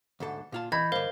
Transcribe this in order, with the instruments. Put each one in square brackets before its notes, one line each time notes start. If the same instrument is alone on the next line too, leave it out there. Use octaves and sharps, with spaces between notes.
[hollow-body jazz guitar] D2 G#2 A4
A#2 F4 A5
[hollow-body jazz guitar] E3 [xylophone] D#5 G6 G#6 [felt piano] B5
[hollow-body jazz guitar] G2 D3 [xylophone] A#4 C5 F5